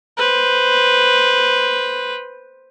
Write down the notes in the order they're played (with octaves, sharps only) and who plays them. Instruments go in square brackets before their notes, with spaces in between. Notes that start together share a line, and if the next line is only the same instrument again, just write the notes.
[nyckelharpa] B4 C5